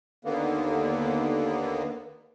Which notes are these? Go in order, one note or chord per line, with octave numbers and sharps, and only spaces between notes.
D#2 D3 A#3 B3